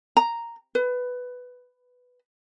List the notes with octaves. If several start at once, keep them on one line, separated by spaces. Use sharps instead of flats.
A#5
B4